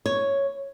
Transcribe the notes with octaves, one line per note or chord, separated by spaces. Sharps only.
C#5